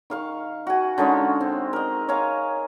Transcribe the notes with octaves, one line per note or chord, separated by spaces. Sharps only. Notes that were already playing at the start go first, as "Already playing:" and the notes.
D#3 F5 C#6
F#4 G#5
D3 G#3 C#4 D#4
C4
A#4 D#5
C#5 F5 G#5 A#5